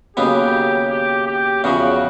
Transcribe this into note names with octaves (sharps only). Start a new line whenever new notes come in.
D#2 C#3 F#3 B3 G4
G4
G4
E2 C#3 F3 F#4